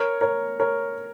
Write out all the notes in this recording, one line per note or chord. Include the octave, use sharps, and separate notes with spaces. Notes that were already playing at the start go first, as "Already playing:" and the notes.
Already playing: A#4 C#5
A#4 C#5
A#4 C#5